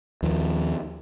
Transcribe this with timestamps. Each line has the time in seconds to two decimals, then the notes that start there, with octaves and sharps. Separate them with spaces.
0.23 D#2 F3